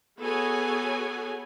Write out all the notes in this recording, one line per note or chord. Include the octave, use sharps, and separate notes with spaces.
B3 F#4 G#4 A4 C#5 G#5